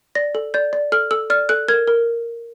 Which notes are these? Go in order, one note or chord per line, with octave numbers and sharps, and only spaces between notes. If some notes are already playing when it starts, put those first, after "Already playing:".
D5 A#6
A4
D5 G6
D5
A4 F6
A4 E6
D5 F6
A4 F#6
A#4 G#6
A#4